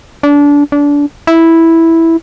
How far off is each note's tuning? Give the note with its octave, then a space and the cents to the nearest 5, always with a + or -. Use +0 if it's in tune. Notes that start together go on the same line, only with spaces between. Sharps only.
D4 -25
D4 -25
E4 -5